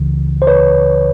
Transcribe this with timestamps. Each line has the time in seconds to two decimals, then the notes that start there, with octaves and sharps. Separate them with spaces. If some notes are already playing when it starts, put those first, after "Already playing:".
Already playing: C#2 C#3 E3
0.42 C5
0.47 B4 C#5